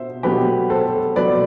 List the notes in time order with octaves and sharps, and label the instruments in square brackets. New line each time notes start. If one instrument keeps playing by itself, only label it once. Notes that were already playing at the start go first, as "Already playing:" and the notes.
Already playing: [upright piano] B2 C5 E5
B2 F#3 A3 G4 B4
A4 C5
B2 F#3 A3 B4 D5